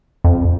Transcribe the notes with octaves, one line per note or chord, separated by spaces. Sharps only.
F2